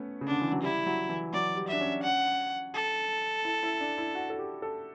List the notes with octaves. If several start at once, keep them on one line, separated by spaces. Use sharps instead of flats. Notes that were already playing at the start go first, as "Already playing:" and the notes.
Already playing: A3 B3 C#4
C#3
D3 D4
E3
F#3
G3 E4
F#3
E3
F#3 D5
G3
D4 E5
C#4
F#5
A4
E4
E4
D4
E4
F#4
A4
G4
A4